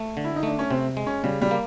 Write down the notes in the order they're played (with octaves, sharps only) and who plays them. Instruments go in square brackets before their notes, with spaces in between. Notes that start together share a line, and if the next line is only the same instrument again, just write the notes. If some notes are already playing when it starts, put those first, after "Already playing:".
Already playing: [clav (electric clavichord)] A3
D3
[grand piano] E4
D#4
[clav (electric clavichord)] A3 [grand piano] D4
[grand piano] C#4
[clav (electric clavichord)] C3 [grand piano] C4
[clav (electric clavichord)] G#3
[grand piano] C#4
[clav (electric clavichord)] C#3 [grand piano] G3
[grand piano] G3
[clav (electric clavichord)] A#3